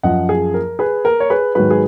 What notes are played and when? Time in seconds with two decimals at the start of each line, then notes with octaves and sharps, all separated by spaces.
0.03 F#2 F3 D#5 F#5
0.29 G#4
0.54 A#4
0.79 G#4 B4
1.05 A#4
1.20 C#5
1.30 G#4 B4
1.55 G#2 D#3 F#3 G#4 B4
1.71 G#4